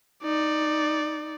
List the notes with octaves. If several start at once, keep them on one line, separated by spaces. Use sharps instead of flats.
D#4 D5